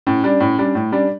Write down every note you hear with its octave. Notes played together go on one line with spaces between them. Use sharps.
A2 C#4
G3 D4
A2
G3 D4
A2 A3
G3 C#4 D4